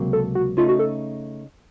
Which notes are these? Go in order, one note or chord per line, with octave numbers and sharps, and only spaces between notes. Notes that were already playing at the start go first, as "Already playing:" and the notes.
Already playing: C#2 C3 F#3 A#3
A4
F#4
C#3 A3 D#4 F4
F#4
A4